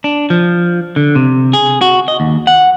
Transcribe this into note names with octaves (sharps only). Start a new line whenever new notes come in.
D4
F3
D3
C3
G#4
F#4
D#5
D#2
F#5